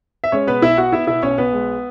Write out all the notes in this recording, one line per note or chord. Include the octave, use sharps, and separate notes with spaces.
E5
G#3 C#4 C#5
B2 B3 B4
B1 E4 E5
B3 F#4 F#5
B3 E4 E5
B2 E4 E5
B1 C#4 C#5
B1 B3 B4
G#3